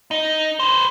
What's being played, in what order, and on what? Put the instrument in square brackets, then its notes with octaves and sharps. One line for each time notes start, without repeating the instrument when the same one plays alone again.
[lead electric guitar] D#4
B4 C5